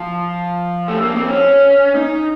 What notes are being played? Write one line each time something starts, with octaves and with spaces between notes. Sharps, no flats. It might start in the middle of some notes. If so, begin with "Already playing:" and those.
Already playing: F3
A3
A#3
C4
C#4
D#4